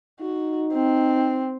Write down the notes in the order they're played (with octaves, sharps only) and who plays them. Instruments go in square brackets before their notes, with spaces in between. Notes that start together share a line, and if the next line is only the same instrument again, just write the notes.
[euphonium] D#4 [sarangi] F#4
[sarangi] C4